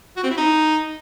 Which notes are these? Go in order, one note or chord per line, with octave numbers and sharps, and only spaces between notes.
F#4
C4
E4
D#4